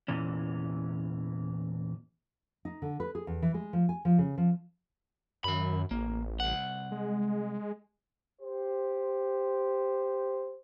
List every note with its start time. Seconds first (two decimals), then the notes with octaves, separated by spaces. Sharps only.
0.08 E2 A#2 E3 C#4
2.65 D#4
2.82 D3
3.00 B4
3.15 G#4
3.27 E2
3.42 E3
3.54 G#3
3.73 F3
3.89 G#5
4.05 F3
4.18 C#3
4.38 F3
5.44 F#2 D#3 B5
5.91 A1 A#3
6.40 C2 F#5
6.92 G#3
8.41 G4 C5